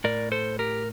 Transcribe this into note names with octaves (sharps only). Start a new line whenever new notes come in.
A2 A#4 D5
A4 C5
G4 A#4